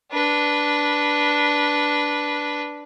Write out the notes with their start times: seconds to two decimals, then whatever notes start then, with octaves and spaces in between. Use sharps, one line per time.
0.12 D4 B4